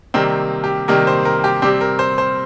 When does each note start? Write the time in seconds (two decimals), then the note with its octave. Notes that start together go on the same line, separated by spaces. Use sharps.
0.14 C3 D#3 G3 A#3 C4
0.64 G4
0.88 C3 D#3 G3 A#3 A#4
1.07 C5
1.25 A#4
1.44 G4
1.62 C3 G3 C4 G4
1.81 A#4
1.99 C5
2.18 C5